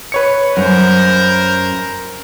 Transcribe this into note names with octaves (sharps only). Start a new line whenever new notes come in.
B4 C#5 C#7
F#2 A#4 C5